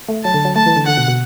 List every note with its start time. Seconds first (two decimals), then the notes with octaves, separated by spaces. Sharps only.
0.09 A3
0.24 F#3 A5
0.34 D3
0.45 F#3
0.56 A3 A5
0.66 E3
0.76 D3
0.86 D3 F#5
0.97 B2
1.08 B2